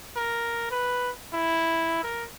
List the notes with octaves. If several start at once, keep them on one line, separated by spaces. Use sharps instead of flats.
A#4
B4
E4
A#4